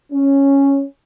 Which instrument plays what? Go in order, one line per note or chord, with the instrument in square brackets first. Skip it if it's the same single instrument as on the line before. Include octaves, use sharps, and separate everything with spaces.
[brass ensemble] C#4